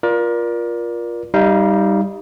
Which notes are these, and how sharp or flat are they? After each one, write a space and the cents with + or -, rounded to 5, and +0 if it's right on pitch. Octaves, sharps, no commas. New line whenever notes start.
F4 +0 A#4 +30 D5 +0
G3 +0 D#4 +15 F5 -20